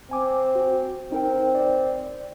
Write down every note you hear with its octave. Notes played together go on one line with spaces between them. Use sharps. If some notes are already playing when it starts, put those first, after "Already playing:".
C4 G#5 D6
F#4
C4 D#4 A#4 G5
D5